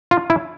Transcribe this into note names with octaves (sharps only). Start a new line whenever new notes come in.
F4
E4